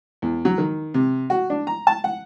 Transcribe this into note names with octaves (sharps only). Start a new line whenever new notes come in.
E2
F#3
D#3
C3
F#4
D4
A#5
A5
F#5